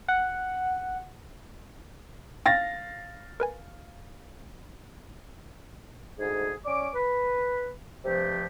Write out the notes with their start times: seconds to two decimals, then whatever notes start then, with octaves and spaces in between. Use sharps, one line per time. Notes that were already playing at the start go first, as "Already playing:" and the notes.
0.08 F#5
2.46 F5 G5 E6 A6 A#6
3.40 A#4 B4 G#5
6.19 D2 G#2 G#4
6.66 C#4 D5 D6
6.94 B4
8.04 G2 C3 F3 A3 G4